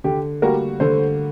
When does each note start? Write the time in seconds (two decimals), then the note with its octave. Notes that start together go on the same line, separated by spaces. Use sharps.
0.04 D3 G4
0.42 G3 A#3 F#4 G4 A#4
0.80 D3 A4 C5